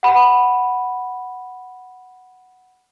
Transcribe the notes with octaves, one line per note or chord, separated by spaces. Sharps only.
F#5 B5